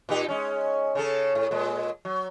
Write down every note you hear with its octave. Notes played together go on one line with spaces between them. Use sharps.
A#2 D#4 G4
G#3 C#4
C#3 C#4 A4
A2
A#2 G#3
F#3